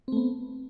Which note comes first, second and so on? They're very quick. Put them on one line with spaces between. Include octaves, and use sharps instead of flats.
C4 A3 B3